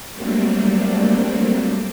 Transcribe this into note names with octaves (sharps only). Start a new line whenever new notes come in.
F#3 G3 A3 A#3 C4 D4